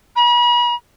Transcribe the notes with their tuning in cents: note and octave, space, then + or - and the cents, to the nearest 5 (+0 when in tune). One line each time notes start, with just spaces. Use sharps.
B5 -40